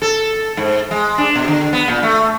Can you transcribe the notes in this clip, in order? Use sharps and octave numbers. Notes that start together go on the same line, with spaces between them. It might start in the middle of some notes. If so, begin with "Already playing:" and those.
A4
G#2
G#3
D4
B2
D3
B3
A#2
A3